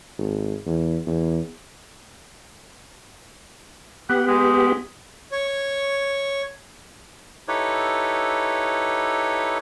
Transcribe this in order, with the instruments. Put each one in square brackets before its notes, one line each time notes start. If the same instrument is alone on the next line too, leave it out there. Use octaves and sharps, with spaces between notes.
[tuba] G#1
E2
E2
[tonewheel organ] B3 G4 [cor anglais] F#5
[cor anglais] G#3
[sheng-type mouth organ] C#5
[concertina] D#4 E4 G4 A4 B4 C#5